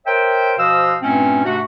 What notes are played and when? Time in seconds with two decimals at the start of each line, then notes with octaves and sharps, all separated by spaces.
0.06 A#4 C5 C#5 E5 G5
0.58 B2 F3 C5 D#5 F5 E6
1.02 G2 A#2 A3 C4 C#4
1.44 G#2 C3 A3 D4 F#4